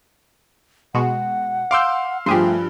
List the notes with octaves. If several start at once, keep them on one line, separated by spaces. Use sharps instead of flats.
B2 G#3 F#4 F#5
F5 C6 D6 E6 G6
G2 F3 A3 G4 G#4 C5